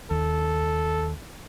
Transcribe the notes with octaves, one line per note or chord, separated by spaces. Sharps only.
D#2 A4